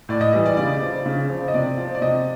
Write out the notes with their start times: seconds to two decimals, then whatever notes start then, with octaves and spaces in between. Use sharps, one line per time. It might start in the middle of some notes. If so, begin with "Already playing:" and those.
0.09 A2 D5
0.21 D#5
0.33 E3 G3 D#5
0.46 D5
0.57 C#3 D5
0.82 F3
1.06 C#3
1.30 F3
1.48 D#5
1.54 C3 D5
1.77 F3
1.95 D5
2.02 C3 D#5